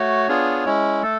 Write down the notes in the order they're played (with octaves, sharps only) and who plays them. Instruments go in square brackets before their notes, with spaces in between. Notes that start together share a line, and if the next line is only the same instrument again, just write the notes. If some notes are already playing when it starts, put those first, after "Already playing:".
Already playing: [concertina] A3 F#4 C#5
B3 D4 F4 G#4
G#3 C#4 E4
A3 A4